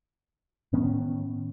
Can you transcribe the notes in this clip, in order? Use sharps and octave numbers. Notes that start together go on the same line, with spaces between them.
A2 D#3 B3 C#4